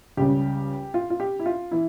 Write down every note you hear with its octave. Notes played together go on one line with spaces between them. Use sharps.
C#2 C#3 G3 G4
F4
F4
G4
E4
F4
E3 E4